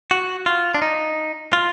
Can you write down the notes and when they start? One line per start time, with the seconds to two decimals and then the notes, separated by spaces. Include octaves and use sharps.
0.11 F#4
0.46 F4
0.75 D4
0.82 D#4
1.53 F4